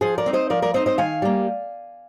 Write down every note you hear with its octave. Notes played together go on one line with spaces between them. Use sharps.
F3 G#4 C5
A#4 D5
C4 D#4
C5 D#5
F3 A#4 D5
A#4 D5
C4 D#4 C5 D#5
C5 D#5
D#3 F5 G#5
G3 A#3